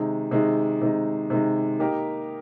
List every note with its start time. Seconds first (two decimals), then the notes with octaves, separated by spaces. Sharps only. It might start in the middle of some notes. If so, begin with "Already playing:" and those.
Already playing: C3 D#3 G#3 D#4
0.31 C3 D#3 G#3 D#4
0.81 C3 D#3 G#3 D#4
1.30 C3 D#3 G#3 D#4
1.79 A#3 D#4 G4 A#4